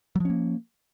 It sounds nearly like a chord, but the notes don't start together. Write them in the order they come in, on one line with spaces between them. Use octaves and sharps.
F#3 F3 C#4 A#3